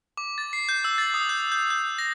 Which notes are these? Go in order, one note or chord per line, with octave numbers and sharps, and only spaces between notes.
D6
A6
C7
G6
E6
A6
D#6
G6
G6
G6
A#6